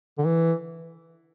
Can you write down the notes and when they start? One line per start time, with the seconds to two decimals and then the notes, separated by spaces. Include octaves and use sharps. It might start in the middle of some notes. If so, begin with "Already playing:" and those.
0.18 D3
0.25 E3